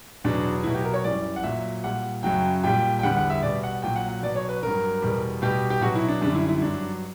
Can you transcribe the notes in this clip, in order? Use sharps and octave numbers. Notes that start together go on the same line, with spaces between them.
E2 B2 F#3 D4
B2 F#3 E4
G4
A#4
C#5
F#2 E3 G3 D5
F#5
A#2 F#3 E5
A#2 G3 F#5
F#2 C#3 F#3 G5
A#2 G3 G5
G5
E2 D3 G3 F#5
F#5
E5
B2 G3 D5
F#5
A#2 F#3 G5
F#5
F#5
B2 F#3 D5
C#5
B4
G2 F#3 A#4
E2 B2 G3
B2 G3 G4
G4
B2 F#3 F#4
E4
D4
F#2 D3 G3 D4
E4
E4
G2 F#3 D4